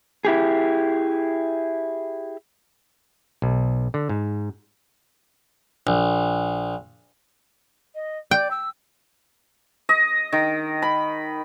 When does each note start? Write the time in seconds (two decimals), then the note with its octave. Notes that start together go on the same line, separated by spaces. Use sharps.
0.25 E4 G4 G#4
3.42 B1
3.94 D3
4.09 G#2
5.87 A#1
7.95 D#5
8.31 D5 G5
8.51 E6
9.89 D#5
10.32 D#3
10.82 B5